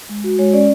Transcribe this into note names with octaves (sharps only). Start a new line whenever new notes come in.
G#3
F#4
G#3 C#5
C#4 D5